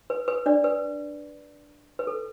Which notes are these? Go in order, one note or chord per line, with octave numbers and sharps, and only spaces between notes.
B4
B4
D4 D5
B4
B4
A4